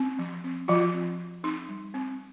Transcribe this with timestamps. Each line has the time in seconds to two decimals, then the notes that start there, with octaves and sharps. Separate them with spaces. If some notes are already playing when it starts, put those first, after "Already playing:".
Already playing: C4
0.19 F3
0.44 C4
0.68 F3 F4
0.93 C4
1.19 F3
1.43 C4 D#4
1.69 G3
1.94 C4